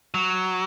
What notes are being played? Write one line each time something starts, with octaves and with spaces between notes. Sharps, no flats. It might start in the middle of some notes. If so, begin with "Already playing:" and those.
F#3